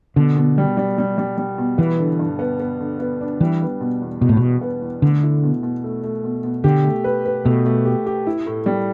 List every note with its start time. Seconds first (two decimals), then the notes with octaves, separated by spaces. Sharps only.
0.16 B2 D3
0.36 B2
0.58 G3
0.77 G3
0.98 G3
1.18 G3
1.37 G3
1.58 B2
1.78 E3 B3
1.99 D3
2.19 G2
2.39 B3
2.60 B3
2.80 D3
2.99 B3
3.21 D4
3.41 E3 G3
3.61 B3
3.81 B2
4.02 E2
4.21 E2 B2
4.29 A2
4.37 E2 B2
4.61 B3
4.81 E2
5.02 D3 A3
5.23 E4
5.43 B2
5.63 B2
5.84 A3
6.03 A3
6.24 B2
6.43 B2
6.64 D3 G4
6.84 A3
7.04 B4
7.25 B4
7.45 B2 A3
7.66 A3
7.85 G4
8.06 G4
8.27 E4
8.46 A2
8.66 G3